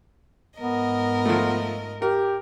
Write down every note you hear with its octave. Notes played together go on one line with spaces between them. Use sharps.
G#2 B3 A#4 D#5
F3 A3
G4 A#4